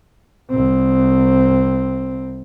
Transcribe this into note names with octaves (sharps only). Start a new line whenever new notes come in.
C2 C4